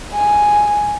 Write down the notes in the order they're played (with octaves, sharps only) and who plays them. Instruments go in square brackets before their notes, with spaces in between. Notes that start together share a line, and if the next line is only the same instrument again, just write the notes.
[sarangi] G#5